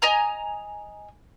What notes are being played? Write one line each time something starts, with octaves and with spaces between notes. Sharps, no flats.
D#5 G#5 A#5